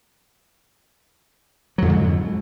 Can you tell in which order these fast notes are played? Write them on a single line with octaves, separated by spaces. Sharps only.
F#3 F2 D3 G#2